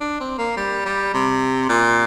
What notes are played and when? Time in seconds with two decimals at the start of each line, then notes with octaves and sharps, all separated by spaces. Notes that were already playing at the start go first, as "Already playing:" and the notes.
0.01 D4
0.20 C4
0.38 A#3
0.57 G3
0.86 G3
1.14 C3
1.69 A#2